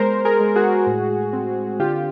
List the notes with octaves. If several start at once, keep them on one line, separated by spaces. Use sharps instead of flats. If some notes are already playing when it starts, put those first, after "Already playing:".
Already playing: G#3 B3 A#4 C5
G#4 A#4
G#3
F#4 G#4
A2
C4
D3 F4 G4